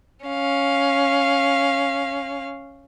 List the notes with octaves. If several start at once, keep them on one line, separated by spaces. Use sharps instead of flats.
C#4 F5